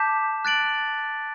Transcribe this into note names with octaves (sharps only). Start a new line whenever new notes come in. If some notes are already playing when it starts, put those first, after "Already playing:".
Already playing: A5 D6 G6 B6 E7
F#6 A6 D7 F#7